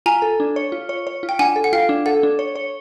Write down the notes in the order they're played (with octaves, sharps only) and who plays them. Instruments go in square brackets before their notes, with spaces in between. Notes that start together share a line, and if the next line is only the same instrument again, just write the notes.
[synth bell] F4 [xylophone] G#5 A#5
[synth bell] A4
D4
C#5
F4
C#5
C#5
F4
[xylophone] G5
[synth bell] D4 [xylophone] F#5 G#5
[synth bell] A4
[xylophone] F#5
[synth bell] F4 [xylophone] F5 G5
[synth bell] D4
[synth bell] A4 [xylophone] F#5
[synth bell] D4
C#5
C#5